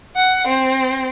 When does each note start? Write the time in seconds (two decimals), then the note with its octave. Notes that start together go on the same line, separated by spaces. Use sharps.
0.16 F#5
0.48 C4